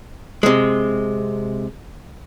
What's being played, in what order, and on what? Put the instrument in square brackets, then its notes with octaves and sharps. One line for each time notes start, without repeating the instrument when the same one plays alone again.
[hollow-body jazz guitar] C3 G#3